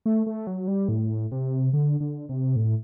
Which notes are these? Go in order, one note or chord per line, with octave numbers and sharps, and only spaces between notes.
A3
A3
F#3
G3
A2
C3
D3
D3
C3
A2